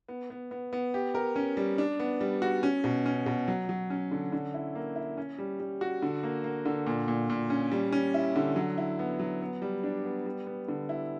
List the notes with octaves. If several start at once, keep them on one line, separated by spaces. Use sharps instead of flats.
B3
B3
B3
B3
G4
A#4
C#4
G3
D4
B3
G3
F#4
C#4
B2
C#4
B2
F#3
F#3
C#4
D3
D3
E4
A#3
E4
C#4
G3
G3
F#4
D3
A#3
A#3
D3
A#2
A#2
A#2
C#4
G3
C#4
E4
D3
F#3
E4
B3
F#3
B3
G3
D4
B3
G3
B3
D3
E4